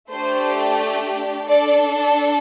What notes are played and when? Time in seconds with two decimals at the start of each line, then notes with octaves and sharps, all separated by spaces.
0.11 A3 D4 G4 C5
1.49 D4 A4 D5